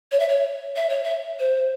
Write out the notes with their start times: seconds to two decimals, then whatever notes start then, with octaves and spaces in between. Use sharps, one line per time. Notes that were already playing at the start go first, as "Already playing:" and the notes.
0.12 C#5
0.20 E5
0.29 C#5
0.76 E5
0.89 C#5
1.04 E5
1.39 C5